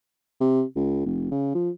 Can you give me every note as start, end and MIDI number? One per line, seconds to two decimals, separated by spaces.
0.41 0.63 48
0.76 1.04 37
1.06 1.27 29
1.31 1.53 49
1.55 1.70 53